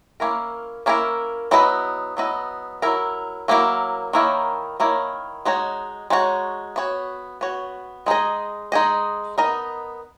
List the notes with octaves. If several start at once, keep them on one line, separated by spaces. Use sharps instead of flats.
A#3 C#4 E4 A#4
A#3 C#4 E4 A#4
F#3 B3 E4 B4 D#5
F#3 B3 E4 B4 D#5
F#3 A#3 E4 A#4
F#3 A#3 E4 A#4
D#3 A#3 E4 A#4 C#5
D#3 A#3 E4 A#4 C#5
G#3 D#4 F#4 C#5
G#3 D#4 F#4 C#5
B3 F#4 C#5
B3 F#4 C#5
G#3 D#4 G#4 D#5
G#3 D#4 G#4 D#5
B3 D#4 A#4 D#5